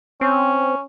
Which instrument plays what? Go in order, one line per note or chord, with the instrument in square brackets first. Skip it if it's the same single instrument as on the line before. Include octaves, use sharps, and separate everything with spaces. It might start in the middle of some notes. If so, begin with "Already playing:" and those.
[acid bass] C4 [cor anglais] C#4